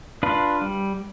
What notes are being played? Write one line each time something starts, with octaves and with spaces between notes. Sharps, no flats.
D4 F4 B4
G3